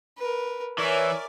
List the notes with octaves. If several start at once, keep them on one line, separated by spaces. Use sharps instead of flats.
A#4 B4
E3 A#4 C#5 D5 E5 G#5 D6